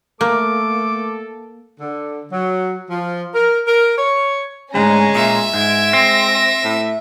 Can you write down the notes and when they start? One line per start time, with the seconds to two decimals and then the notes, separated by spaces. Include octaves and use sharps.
0.21 A3 A#3 A4 D6
1.80 D3
2.31 F#3
2.89 F3
3.34 A#4
3.67 A#4
3.97 C#5
4.75 D2 G#2 G#3 C#4 G#5 A#5
5.15 A#2 E5
5.54 G#2 G#3 G#6 D7
5.93 C4 A#6
6.64 A2